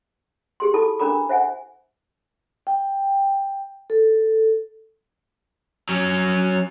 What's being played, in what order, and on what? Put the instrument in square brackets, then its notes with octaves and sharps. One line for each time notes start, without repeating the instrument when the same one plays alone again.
[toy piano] G4 G#4 C6
E4 A4 A5 B5 D6
C#4 D4 A#4 A#5 B5 D6
C5 E5 F#5 G#5
[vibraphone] G5
A4
[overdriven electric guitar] F#3 C#4